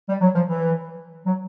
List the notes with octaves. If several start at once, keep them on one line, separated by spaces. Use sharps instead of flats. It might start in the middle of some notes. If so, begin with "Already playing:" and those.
G3
F#3
F3
E3
F#3